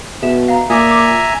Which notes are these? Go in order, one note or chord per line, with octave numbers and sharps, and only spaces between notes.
B2 G#4 E5 E7
F5 A#5
A#2 E5 G#5 A#5 D6 D#6
D6